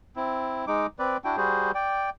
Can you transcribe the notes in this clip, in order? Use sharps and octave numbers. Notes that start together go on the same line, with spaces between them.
C4 E4
G#3 D#4 D6
C4 B4 D5
D4 E4 F#4 G5
G3 F#4 G#4 C5
D5 G5